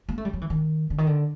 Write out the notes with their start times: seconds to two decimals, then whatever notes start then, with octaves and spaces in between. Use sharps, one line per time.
0.09 A#3
0.18 A3
0.25 G3
0.33 F#3
0.41 E3
0.50 D#3
0.90 D3
0.98 D#3
1.07 D3